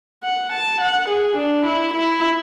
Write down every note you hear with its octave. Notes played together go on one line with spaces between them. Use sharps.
F#5
A5
F#5
G#4
D4
E4
E4